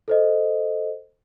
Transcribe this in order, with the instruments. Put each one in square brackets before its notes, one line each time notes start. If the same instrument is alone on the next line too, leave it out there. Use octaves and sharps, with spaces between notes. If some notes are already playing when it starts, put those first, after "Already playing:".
[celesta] A4 C5 D#5